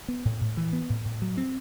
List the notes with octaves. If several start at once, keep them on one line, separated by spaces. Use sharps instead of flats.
B3
A2
A2
E3
B3
A2
A2
F#3
C4